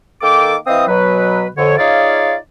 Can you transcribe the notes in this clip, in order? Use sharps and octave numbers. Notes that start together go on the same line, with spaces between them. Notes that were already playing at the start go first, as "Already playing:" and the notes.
D#3 A#3 A4 G5 D6
E3 C4 D#5 F5 D#6
B2 F#3 B4
F2 D3 C#5
D#4 F4 G#4 C#5 D5 F5